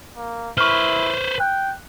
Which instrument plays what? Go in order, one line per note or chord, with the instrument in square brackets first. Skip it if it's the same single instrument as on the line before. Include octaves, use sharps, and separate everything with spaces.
[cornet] A#3
[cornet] E4 [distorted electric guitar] B4 C5 [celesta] C#6 F6
[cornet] G5 [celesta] F#6